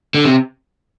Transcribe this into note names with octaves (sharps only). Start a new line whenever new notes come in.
D3
C3